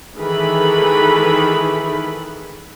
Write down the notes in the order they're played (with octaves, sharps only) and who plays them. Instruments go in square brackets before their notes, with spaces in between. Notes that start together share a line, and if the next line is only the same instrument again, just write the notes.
[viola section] D#3 E3 G#4 A4 B4 B5